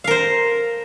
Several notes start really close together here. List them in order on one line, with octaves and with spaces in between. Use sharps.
F5 A#4 C5